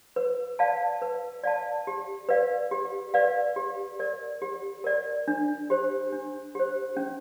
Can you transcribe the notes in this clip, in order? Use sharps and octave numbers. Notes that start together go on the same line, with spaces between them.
B4
D5 F5 A5
B4
D5 F5 A5
G4
B4 D5 F5
G4
B4 D5 F5
G4
A#4 D5
G4
A#4 D5
D4
G4 C5
D4
G4 C5
C#4